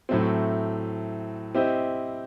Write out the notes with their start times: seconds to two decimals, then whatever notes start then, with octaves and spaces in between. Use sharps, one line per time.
0.09 A2 F#3 A3 C4
1.55 C4 E4 G4 C5 D#5